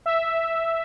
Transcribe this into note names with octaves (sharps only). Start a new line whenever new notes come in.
E5